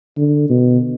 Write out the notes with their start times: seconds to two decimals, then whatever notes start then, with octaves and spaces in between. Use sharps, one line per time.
0.17 D3
0.49 B2